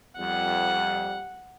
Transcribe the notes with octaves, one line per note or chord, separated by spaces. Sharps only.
F2 G3 F#5